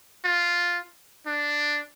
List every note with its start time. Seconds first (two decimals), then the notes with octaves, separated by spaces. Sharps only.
0.25 F4
1.27 D4